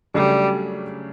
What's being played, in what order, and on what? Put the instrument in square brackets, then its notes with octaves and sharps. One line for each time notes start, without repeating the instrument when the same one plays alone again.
[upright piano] C#3 F#3 A3 D4 [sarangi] G3